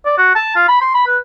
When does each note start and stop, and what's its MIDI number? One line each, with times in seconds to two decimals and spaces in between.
0.05 0.13 74
0.18 0.35 66
0.35 0.55 81
0.55 0.64 65
0.68 0.79 83
0.81 0.92 84
0.94 1.05 83
1.06 1.18 71